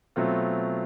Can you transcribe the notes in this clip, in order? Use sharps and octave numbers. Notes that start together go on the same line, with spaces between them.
B2 F#3 A3 C4 F4